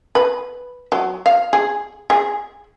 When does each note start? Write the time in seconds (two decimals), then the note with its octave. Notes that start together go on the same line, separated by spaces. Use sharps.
0.15 B4
0.92 F#3
1.26 F5
1.53 G#4
2.10 G#4